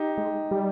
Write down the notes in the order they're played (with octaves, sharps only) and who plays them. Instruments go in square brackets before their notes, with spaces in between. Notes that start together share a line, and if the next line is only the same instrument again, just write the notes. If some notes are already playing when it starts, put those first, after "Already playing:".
Already playing: [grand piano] D#4 G4
[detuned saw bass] G#3
G3